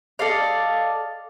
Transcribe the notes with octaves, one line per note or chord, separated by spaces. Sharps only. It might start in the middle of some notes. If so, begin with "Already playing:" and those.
A4 D5 D#5 F5